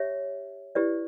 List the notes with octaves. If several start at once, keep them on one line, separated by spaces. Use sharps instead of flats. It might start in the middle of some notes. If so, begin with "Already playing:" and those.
Already playing: G4 C#5 E5
E4 G4 B4 D5